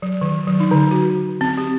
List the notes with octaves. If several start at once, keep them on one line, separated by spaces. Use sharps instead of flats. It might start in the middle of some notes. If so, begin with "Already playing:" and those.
F#3
D#3
F#3
D#4
D3
F#4
C4
G4